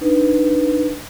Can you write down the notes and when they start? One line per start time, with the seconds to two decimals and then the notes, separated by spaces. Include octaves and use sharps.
0.01 D4 D#4 B4